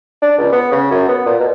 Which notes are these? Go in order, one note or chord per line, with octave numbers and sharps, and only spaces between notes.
D4
C#2
B3
C#3
F#2
B3
A#2
B2